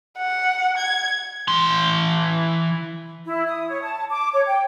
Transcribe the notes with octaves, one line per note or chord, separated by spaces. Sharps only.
F#5
G#6
E3 C6
E4
D#6
C#5
A5
D6
C#5
G5